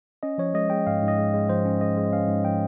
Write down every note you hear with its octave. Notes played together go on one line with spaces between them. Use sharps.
C#4 D#5
F3 C#5
G#3 D#5
G#3 G5
G#2 F5
G#2
D#5
G#3
G#3
F3 C5
C#4
G#3 D#5
G#3
C#4 F5
G#2
F3 G5